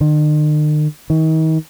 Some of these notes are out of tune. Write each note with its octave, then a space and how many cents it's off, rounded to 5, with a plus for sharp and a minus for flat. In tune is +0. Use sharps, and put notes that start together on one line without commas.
D#3 -45
D#3 +35